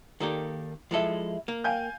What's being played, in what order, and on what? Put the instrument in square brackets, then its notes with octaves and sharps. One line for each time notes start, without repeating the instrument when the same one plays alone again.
[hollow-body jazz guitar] D#3 A#3 G4 [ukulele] A4 D5
[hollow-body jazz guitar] F3 G#3 A4 [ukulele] E4 E5
[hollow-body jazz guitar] A#3
[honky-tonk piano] F5 G#5 G6 [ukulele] G5